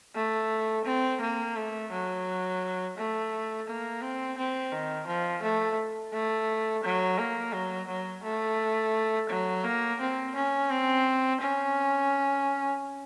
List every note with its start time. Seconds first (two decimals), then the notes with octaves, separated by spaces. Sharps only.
0.15 A3
0.85 C4
1.21 A#3
1.56 A3
1.91 F#3
2.97 A3
3.67 A#3
4.02 C4
4.38 C4
4.72 D#3
5.07 F3
5.43 A3
6.13 A3
6.84 F#3
7.19 A#3
7.53 F#3
7.88 F#3
8.24 A3
9.30 F#3
9.64 A#3
10.00 C4
10.35 C#4
10.70 C4
11.41 C#4